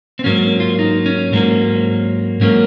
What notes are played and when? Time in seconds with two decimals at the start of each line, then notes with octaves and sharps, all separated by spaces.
0.19 C4
0.24 G#2 F#3 A#3 C#4
0.60 F4
0.79 D#4
1.06 C#4
1.33 G#2 F#3 A#3
2.41 G#2 F#3 A#3 C#4